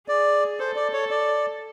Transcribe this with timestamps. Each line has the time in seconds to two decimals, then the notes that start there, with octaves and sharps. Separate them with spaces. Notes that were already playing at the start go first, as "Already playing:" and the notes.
0.08 G#4 D5
0.59 A4 C5
0.76 D5
0.93 C#5
1.10 D5